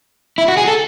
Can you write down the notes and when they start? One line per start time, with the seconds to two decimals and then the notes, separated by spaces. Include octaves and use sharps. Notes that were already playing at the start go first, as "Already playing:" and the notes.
0.38 E4
0.48 F#4
0.57 G#4
0.68 A4